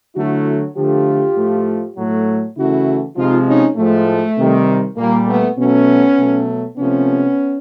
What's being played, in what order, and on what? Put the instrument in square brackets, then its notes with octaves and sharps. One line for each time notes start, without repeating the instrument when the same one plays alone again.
[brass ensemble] D3 F#3 A3 E4 F#4
D3 F3 A3 F4 G4
A2 F3 A3
A2 F#3 A3
C#3 E3 A3 E4 F#4
C3 F3 G#3 D#4 F4
C#4 D#4
A2 F3 G#3 A3
C3 D#3 G3
A#2 G3 A#3
A3 B3
B2 F#3 A3 B3 C#4
B2 F#3 A3
C3 F3 A3 B3 C#4